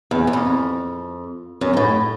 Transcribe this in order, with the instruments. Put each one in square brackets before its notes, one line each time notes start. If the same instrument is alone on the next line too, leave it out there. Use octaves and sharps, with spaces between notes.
[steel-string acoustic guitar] E2
E2
F2
F#2
G#2
A2